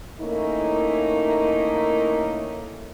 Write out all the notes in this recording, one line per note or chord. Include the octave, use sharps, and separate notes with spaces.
D#3 A3 A#3 C#4 D#4 E4